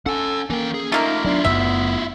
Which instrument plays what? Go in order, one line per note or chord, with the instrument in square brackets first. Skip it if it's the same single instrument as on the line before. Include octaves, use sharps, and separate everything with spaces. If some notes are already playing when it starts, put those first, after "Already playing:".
[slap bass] C#4 [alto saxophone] A4 [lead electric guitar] F#5 G#5
[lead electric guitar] E3 G5 [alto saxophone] A#3 [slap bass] C#4
[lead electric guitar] G#4
[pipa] A3 A#3 A#4 [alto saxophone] D#4 [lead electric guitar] F4 E5
[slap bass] F#3 B3 [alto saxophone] D4 [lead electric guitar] E4 F4
[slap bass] F#1 F#2 A3 [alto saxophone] B3 [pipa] E5